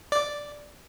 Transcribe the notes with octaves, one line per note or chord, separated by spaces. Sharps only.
D5